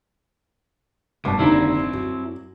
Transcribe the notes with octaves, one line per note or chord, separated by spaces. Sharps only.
F1 G2 B2 A5 D6
D#2 D3 C4 E4 A#5
F#2 F#4